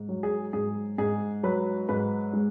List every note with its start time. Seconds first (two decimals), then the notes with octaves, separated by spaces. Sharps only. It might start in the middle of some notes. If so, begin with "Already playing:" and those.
Already playing: G#2
0.09 F#3
0.23 G#4
0.53 G#2 G#4
0.98 G#2 G#4
1.43 F#3 B4
1.89 G#2 B4
2.33 G#3